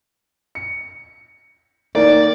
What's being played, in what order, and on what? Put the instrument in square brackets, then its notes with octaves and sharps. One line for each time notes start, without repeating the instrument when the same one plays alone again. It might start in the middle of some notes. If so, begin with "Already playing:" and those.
[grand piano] C#7
[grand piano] D#3 A#3 [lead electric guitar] D5